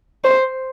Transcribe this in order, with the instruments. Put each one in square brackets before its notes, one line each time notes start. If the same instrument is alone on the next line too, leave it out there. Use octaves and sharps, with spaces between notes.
[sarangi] C5